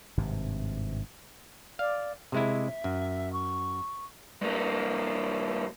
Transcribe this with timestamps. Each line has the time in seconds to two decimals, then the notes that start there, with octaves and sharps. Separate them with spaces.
0.17 G#1 G2 C3
1.79 D5 F5
2.32 C3 G#3 E4 E5
2.84 F#2
3.33 C#6
4.42 G2 A#3